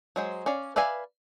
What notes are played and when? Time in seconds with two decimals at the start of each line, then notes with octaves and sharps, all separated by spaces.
0.16 F#3 G#3 C5
0.46 C#4 D5 F5
0.76 B4 D5 E5 F5 G#5